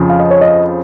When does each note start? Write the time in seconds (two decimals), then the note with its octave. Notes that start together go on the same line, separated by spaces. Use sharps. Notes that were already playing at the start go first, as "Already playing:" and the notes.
Already playing: F2 C#3 F3
0.10 F5
0.20 D#5
0.31 C#5
0.41 D#5